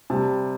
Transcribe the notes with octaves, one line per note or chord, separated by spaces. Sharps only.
C3 G3 A5